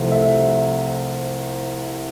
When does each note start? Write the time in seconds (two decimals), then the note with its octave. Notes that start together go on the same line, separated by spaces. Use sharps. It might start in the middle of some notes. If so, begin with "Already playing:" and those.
Already playing: C2 C3 F3 A3 C4
0.11 E5